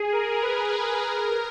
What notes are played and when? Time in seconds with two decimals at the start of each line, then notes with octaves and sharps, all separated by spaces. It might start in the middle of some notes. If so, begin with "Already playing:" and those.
Already playing: G#4
0.12 A#4
0.42 B4
1.02 A#4